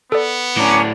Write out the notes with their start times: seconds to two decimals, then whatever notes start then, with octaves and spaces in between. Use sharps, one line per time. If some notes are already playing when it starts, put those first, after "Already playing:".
0.12 B3 A4 D5
0.57 A2 C#4 D4 A#5 D6